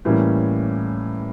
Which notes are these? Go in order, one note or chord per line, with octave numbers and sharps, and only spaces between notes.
A2 E3 G3 A#3 C#4